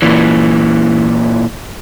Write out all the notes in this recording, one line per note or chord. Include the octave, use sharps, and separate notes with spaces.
A#2 E3